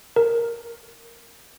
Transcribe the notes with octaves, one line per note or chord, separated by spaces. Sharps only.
A#4